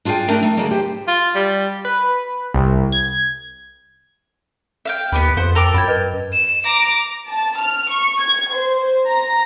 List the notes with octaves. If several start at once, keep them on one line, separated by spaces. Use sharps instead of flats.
D4 F4 G#4 F5 G5
A3 D4 D#4 A#4
A3 D#4
D3 F#3 G#3 A#3
G4 C5
F4
G3
B4
C2
G#6
E5 F5 G5
D#2 B3 G4 B4
F2 C5 F#5
A4 A#4 G5 D6 F7 G7
F#2 G5 A5 B5 G#6
A#4 B4 D#5
E7
A#5 D6
A5
F6
C#6
G#6
C5
A#5